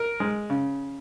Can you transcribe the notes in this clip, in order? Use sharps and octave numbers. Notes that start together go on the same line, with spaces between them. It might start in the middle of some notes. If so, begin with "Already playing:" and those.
Already playing: A#4
G#3
C#3